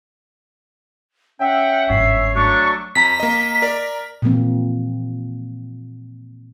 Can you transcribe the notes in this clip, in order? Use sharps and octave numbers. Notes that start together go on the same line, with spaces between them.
C#4 E5 F#5 G5
G1 G#2 C#5 C7
F#3 A3 D4 C#6
F2 A#5 B6
A#3 D#5
A#4 D5
A#2 E3 F3 A#3 C4